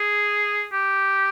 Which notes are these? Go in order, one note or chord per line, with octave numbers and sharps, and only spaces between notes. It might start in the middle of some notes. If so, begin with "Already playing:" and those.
Already playing: G#4
G4